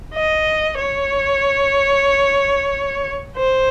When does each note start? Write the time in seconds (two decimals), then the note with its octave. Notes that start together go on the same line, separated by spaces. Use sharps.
0.15 D#5
0.79 C#5
3.37 C5